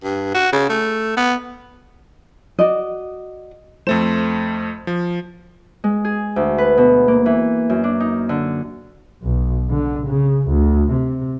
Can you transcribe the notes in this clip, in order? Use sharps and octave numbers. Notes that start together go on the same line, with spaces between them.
G2
F#4
C#3
A3
B3
F#4 D5 D#5
F2 A3 C5 E7
F3
G#3
G#4
D2
B4
B2
A#3
E3
F#2
D4
D#4
D3
B1
D3
C#3
D2
C3